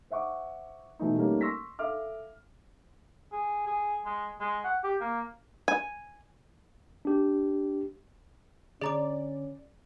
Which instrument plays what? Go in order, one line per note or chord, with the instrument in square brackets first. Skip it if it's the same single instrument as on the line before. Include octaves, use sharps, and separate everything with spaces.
[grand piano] C5 E5 F#5 C#6 D6
B2 E3 A3 D#4
G3 A3 A#3 C#4 D#4
C6 C#6 E6 A#6 B6
A4 E5 F5 D6 F6
[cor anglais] G#4
G#4
G#3
G#3
F#5
G4
A#3
[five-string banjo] G#5
[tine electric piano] D4 G4
[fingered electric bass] D3 [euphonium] C#4 [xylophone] G#4 A#5 D6 [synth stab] D5